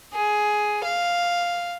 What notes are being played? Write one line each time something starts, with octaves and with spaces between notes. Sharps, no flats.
G#4
F5